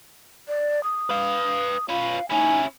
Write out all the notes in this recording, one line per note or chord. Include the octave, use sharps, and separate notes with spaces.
D5
D#6
B4 F5
C#4 F4 B4 F5
C#4 D#4 E4 G#5